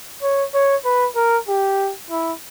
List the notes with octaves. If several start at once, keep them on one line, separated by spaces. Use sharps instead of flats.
C#5
C#5
B4
A#4
G4
E4